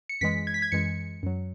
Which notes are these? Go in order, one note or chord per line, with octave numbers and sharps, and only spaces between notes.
C#7
F#2 E3 G#3 B6
G#6
B6
G#6
F#2 E3 G#3 C#7
F#2 F#3